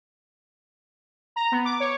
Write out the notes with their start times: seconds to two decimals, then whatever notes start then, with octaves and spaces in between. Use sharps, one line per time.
1.36 A#5
1.52 B3
1.65 D6
1.80 C#5